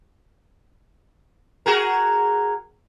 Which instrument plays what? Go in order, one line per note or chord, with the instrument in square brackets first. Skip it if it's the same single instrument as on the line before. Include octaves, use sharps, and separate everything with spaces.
[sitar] F#4 G#4 A#4